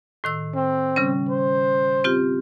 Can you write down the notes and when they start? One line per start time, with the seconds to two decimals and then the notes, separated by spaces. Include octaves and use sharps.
0.24 A2 D#3 E6
0.55 C4
0.96 C#3 G3 C#4
1.29 C5
2.04 C4 F4 G4